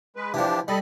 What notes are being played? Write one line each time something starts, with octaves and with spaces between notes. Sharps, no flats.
G#3 B4
E3 F3 D4 G4
G3 A4 D#5 B5